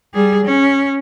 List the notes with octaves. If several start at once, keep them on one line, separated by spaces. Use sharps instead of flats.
G3 G#4
C#4